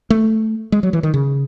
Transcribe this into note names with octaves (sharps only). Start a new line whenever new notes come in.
A3
G#3
F#3
E3
D#3
C#3